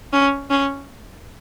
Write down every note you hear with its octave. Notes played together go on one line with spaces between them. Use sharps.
C#4
C#4